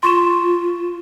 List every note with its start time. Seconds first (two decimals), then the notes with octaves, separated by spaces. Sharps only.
0.03 F4 C6 C#6 E7